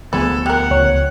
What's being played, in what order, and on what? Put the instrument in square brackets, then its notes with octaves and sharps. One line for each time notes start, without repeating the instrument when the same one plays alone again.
[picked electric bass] D2 F3 B3 [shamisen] G#4 B4 [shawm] A4
[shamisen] G4 A#4 [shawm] F#5
[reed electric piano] C#2 C#5